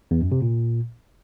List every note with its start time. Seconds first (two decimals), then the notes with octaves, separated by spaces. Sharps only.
0.11 E2
0.21 F#2
0.32 C3
0.42 A#2